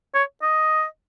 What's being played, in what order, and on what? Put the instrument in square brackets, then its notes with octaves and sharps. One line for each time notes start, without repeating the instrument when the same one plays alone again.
[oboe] C#5
D#5